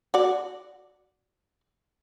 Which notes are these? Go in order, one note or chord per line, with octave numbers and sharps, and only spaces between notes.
F#4 D5